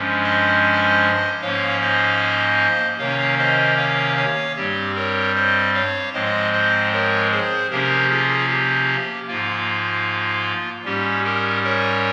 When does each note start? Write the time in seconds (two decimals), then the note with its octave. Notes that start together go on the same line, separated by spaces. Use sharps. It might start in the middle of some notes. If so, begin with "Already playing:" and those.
Already playing: G2 F3 G#3 C#4
0.23 C5 D#5
1.41 G#2 F3 A#3 C#4 C#5 F5
1.81 C5 D#5
2.99 C3 D#3 A#3 C#4 C#5 F5
3.38 C5 D#5
3.77 C#5 F5
4.17 C#5 F5
4.56 G2 G3 C4 G4
4.95 A#4 C#5
5.35 C5 D#5
5.74 C#5 F5
6.13 G#2 F3 G#3 C4 C5 D#5
6.52 C5 D#5
6.92 A#4 C#5
7.31 G#4 C5
7.70 C3 F3 A#3 C#4 G4 A#4
8.10 F4 G#4
8.49 G4
9.27 G#2 F3 A#3 F4
10.84 G#2 G3 C#4 G4
11.24 G4 A#4
11.64 A#4 C#5